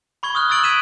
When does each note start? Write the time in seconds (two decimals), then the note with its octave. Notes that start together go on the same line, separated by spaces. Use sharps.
0.23 B5 C#6 G#6 G7
0.35 D#6 F6 F#6
0.50 E6 F6 A6 D7 F#7
0.63 F#6 G#6 B6 D#7 E7 F#7